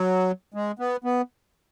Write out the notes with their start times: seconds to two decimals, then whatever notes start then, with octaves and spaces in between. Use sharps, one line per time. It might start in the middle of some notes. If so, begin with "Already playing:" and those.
Already playing: F#3
0.54 G#3
0.79 B3
1.04 B3